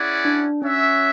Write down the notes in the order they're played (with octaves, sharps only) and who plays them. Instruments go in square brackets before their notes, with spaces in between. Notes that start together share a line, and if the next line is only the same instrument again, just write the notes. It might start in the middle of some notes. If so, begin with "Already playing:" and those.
Already playing: [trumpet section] C#4 E4 G#4 D5 F#5
[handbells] D4
[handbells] C#4 [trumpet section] F#4 C#5 E5